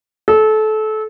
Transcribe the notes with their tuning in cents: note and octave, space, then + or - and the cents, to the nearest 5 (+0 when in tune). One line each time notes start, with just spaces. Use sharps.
A4 -25